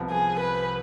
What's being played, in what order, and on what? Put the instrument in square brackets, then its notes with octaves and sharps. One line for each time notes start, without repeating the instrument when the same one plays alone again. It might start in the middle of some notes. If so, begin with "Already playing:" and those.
Already playing: [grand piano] C2 C3 F3 B3
[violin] G#4
B4